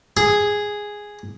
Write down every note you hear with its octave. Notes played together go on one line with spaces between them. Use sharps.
G#4